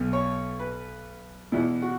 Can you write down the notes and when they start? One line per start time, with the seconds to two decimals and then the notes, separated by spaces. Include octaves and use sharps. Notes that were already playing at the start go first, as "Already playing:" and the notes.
Already playing: B1 B2
0.13 C#5
0.59 B4
1.52 E2 B2 E4
1.82 F#4